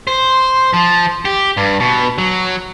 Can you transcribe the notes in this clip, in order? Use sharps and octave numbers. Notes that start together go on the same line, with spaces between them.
C5
F3
G4
G2
B2
F#3